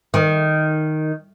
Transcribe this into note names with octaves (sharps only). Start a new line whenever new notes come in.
D#3